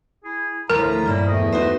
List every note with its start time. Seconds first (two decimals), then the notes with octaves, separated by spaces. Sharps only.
0.24 E4 G#4
0.70 D2 A2 F3 A3 F4 A#4 B4 A#5
1.06 G2 A#2 G3 A#3 E4
1.27 E2 D#3 A3 C5 D#5
1.52 D#4 F#4 B4 C5 D#5